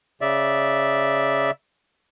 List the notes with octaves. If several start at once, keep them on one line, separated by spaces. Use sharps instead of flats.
C#3 D5 E5